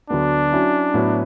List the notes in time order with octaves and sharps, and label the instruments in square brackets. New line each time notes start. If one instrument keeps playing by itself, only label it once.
[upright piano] D2 D3 F#3 B3 [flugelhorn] D4
[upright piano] F#3 C#4 E4
A2 F#3 B3 E4